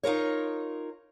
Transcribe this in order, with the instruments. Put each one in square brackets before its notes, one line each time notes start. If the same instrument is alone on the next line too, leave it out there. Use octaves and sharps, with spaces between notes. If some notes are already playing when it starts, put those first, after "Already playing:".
[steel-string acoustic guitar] D#4 F4 A#4 C#5